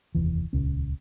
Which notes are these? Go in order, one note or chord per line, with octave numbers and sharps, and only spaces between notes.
F1 D#2 E3
D#1 C#2 C#4